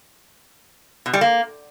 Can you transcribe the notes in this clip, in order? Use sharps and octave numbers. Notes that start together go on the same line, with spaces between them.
B2
G3
A#3